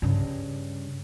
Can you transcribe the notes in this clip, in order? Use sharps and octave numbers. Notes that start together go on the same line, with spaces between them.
G2 C#3